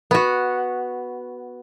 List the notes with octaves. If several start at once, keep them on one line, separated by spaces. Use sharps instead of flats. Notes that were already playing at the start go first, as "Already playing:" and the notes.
B3 F#4